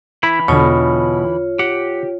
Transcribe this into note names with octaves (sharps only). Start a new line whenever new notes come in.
E3 E4 B5
E2 B2 D3 F4 C#5
G4 F#5